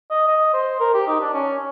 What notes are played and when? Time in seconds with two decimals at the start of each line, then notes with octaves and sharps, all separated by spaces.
0.11 D#5
0.27 D#5
0.54 C5
0.80 A#4
0.94 G4
1.07 D#4
1.20 D4
1.34 C#4